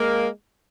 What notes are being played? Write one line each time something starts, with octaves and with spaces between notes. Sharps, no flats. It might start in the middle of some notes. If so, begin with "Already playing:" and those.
Already playing: G#3 A#3